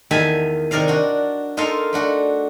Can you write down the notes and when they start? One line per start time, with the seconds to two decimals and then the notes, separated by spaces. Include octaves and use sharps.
0.11 E2 D#3 E5 G#5 A5 B5
0.71 C3 D#3 A#4 D5 F5
0.88 D4 F#4
1.57 D#4 F4 A4 A#4 F5
1.93 A3 D4 F#4